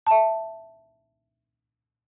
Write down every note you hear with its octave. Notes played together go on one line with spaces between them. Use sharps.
E5 A5